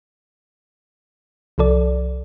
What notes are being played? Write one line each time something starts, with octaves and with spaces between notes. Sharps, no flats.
C2 F3 A4 D5